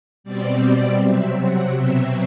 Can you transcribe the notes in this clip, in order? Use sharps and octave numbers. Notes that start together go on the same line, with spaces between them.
B2 G3 C4 D5
D5
C3 F#3 C4 E5
F#5
B2 F#3 C4 E5